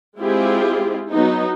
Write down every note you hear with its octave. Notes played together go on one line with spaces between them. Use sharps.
G#3 C4 E4 F4 G4 G#4
F#3 B3 D#4